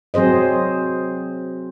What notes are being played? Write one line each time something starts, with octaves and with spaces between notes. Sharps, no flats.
F#3 C4 G#4 C5 D#5